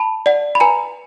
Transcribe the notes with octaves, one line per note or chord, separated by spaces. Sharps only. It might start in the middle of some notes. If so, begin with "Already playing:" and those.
Already playing: A5 B5
D5 F#5
B5
B4 G#5 A#5